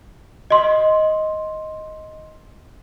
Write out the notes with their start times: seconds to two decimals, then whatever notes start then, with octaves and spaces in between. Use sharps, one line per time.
0.50 D#5 C6